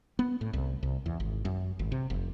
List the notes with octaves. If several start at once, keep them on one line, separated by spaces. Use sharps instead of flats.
B3
A2
C2
C2
E2
G#1
F#2
G#1
C3
F1